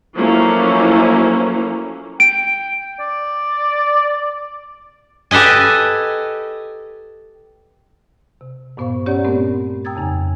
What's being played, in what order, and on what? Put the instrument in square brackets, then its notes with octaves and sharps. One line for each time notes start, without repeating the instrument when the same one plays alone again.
[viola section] F3 F#3 A3 A#3 C#4 E4
[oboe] G5 [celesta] D7
[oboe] D5
[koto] G4 A4 B4 D#5 G#5
[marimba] C3
G2 A#2 B3 C5 F5 C#6
C#4 G4 C#5 D5 F#5 A#5
A3 B3 C4 G4 A#4
G5 A#5 D#6 E6 G#6 A6
F2 C#3 D#4 G5 G#5